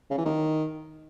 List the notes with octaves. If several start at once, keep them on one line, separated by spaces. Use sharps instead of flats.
C#3
E3
D#3